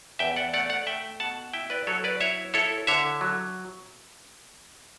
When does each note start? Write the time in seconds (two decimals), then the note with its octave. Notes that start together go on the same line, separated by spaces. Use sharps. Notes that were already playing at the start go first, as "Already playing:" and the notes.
0.19 E2 E5 G5
0.36 D5 F#5
0.53 A3 D5 F#5
0.69 D5 F#5
0.87 A3 E5 G5
1.20 B2 F#5 A5
1.53 E4 E5 G5
1.70 B4 D5
1.87 F#3 A4 C#5
2.04 B4 D5
2.21 E4 C#5 E5
2.54 E4 A4 C#5
2.87 D3 C#5 E5
3.21 F#3